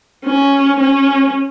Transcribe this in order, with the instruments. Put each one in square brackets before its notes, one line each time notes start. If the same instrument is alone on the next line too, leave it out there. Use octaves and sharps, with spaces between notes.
[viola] C#4
C#4